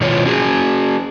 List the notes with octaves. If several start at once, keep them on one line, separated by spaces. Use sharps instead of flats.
B2 D#3 F4 C#5
C#4 F#4 G#4